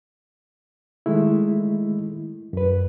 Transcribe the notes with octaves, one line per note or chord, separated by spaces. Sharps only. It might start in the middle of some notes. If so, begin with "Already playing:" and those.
D#3 G#3 A3 E4
F#2 B4